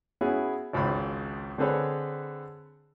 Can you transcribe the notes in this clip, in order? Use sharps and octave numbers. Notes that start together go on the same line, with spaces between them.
B3 C#4 E4 F#4 G#4
G#1 C#2 G#2 B5
D3 C4 G#4 A4 B4 C#5